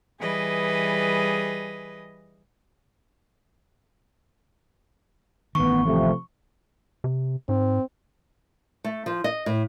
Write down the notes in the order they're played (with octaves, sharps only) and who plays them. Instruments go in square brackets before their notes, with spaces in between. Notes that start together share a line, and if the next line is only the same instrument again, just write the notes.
[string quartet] E3 G3 G#4 B4 D#5
[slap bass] A1 D#3 [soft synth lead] B3 [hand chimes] C#6
[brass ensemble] C3 A3 [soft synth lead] F3
[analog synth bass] C3
[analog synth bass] G#2 [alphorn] C4
[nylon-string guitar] A3
F3
D#5
A2